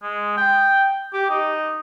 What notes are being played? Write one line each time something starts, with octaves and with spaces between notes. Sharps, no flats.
G#3
G5
G4
D#4